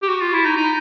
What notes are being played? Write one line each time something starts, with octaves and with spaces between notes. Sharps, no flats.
G4
F#4
F4
E4
D#4
D#4